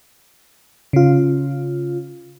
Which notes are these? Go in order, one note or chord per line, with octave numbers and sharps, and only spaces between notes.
C#3 F4